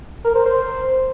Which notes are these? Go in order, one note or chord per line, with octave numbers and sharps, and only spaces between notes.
A#4
C5
C5